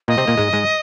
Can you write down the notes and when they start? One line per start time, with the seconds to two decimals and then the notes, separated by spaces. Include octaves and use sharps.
0.08 A#2 A#3 D#5
0.17 C3 C4
0.27 A#2 A#3
0.37 G#2 G#3
0.53 G#2 G#3